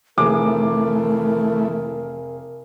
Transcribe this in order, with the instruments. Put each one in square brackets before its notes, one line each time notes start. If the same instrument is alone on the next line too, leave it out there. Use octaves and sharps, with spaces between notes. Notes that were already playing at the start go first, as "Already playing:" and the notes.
[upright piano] F1 G#4 D6 [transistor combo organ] E3 A3 [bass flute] A#4